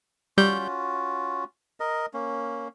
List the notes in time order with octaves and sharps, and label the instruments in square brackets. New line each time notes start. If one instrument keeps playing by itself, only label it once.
[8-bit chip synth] G3 G6 [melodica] C#4 F4 F#4
[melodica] A#4 D#5
A#3 C#4